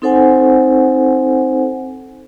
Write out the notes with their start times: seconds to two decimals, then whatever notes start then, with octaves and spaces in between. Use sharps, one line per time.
0.02 C4 D#4 A4 C5 F#5 G#5